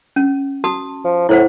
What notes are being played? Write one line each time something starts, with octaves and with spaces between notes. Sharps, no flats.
C#4
F#4 A5 D#6
F3
A2 E4 C5 F#5